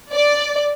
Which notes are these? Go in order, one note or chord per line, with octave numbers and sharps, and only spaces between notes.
D5